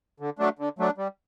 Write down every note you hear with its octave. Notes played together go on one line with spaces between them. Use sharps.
D3
F#3 A3 D4
D3
F#3 A3 D4
G3